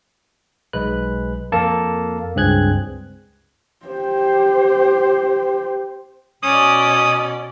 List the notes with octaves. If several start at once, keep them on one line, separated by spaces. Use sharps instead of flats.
B1 G#3 B4 F#6
F2 A#3 A4 A#4 A5
C#2 G2 C4 G#4 F#6 G#6
G4 C5
B2 C#4 D5 D#6